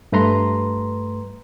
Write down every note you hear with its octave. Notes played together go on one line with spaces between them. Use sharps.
G2 A3 B4 A#5 C6